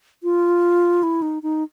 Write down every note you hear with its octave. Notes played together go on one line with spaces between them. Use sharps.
F4
E4
D#4
D#4